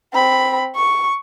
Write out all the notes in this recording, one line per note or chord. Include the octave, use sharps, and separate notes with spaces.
C4 B5
C#6